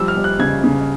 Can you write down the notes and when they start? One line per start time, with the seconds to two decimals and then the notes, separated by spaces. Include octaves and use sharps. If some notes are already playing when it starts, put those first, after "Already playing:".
Already playing: F3 G3 E6
0.08 F6
0.17 G3
0.24 F#6
0.39 C#3 G#6
0.64 C#3